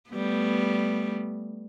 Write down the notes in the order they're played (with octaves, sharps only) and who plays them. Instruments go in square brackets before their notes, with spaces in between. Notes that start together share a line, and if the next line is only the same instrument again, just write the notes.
[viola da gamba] G3 A3 B3